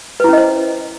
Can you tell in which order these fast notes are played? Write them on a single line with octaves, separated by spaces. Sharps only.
B4 E4 C#4 D#5 C5